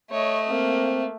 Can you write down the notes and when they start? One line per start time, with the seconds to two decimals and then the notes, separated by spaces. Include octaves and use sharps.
0.12 A3 C#5 D#5
0.50 A#3 C4